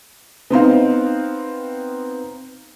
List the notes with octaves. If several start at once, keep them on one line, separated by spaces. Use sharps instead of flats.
B3 C4 D#4 F5